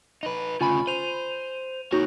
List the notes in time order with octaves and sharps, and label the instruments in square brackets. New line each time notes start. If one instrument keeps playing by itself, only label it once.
[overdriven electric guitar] D#4 B4
[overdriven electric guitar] D2 C#3 [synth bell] F4 G#5 B5
[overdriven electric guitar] C5 [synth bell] D#7 F7
[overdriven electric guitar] A#3 C#5 [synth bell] D#4 F#4